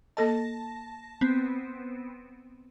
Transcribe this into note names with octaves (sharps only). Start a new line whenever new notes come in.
A#3 A4 D#5 A5 A#6
B3 C4